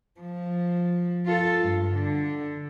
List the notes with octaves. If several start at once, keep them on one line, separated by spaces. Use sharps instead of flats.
F3
F4 A4
G2
D3